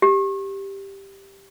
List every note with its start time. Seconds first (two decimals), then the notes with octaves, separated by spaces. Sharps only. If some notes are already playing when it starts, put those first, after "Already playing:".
0.02 G4